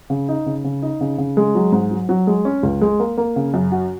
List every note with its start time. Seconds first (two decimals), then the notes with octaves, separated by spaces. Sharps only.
0.10 C#3
0.28 D#4
0.46 C#3
0.64 C#3
0.82 D#4
1.01 C#3
1.18 C#3
1.37 G#3
1.55 F#3
1.72 G#2
1.91 F#3
2.09 F#3
2.27 G#3
2.45 C#4
2.63 C#2
2.81 G#3
3.00 A#3
3.18 A#3
3.36 C#3
3.54 F#2
3.72 F#4